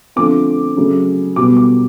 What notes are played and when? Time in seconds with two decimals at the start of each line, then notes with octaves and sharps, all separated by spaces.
0.16 D3 F3 A3 C4 D6
0.77 C#3 F#3 A3
1.36 B2 G3 B3 D6
1.57 D6